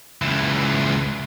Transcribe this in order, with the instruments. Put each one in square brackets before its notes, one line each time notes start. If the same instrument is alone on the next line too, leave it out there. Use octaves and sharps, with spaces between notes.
[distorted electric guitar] C#2 E3